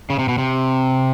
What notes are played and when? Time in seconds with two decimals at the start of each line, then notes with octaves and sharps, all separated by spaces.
0.10 C#3
0.19 C3
0.28 B2
0.38 C3